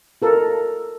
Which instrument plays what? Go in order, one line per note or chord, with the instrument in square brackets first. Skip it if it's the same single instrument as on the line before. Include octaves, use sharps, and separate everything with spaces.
[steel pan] F4 A4 A#4